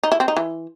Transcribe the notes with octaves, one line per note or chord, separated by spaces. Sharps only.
D#4
E4
C4
D#4
E3